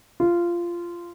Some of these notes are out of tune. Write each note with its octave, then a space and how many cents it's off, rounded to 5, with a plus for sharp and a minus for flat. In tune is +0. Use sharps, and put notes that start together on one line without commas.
F4 -15